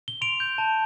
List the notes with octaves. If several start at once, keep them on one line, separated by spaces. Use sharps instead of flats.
G7
C6 D7 F7
G6
A5